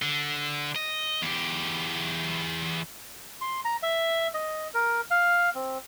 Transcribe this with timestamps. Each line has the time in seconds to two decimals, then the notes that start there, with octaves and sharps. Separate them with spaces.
0.02 D3
0.76 D#5
1.22 E2 G4
3.41 C6
3.65 A#5
3.83 E5
4.34 D#5
4.74 A#4
5.11 F5
5.55 C4